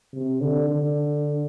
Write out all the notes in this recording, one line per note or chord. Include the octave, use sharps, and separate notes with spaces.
C3
D3
D3